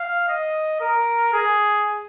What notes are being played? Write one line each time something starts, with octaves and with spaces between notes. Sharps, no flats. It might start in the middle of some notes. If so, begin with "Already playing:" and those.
Already playing: F5
D#5
A#4
G#4